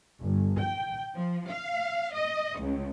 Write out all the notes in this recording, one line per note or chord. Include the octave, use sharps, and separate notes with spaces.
G1
G5
F3
F5
D#5
C#2